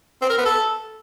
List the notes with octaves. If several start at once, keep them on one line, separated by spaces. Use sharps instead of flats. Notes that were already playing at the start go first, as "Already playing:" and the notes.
C4
A#4
B3
A4